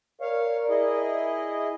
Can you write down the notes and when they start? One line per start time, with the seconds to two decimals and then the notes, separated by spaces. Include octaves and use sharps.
0.21 A#4 C#5 D5 F5
0.69 E4 G#4 D#5